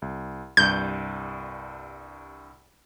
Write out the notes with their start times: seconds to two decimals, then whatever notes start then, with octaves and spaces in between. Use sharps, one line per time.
0.02 C2
0.57 C2 G2 G6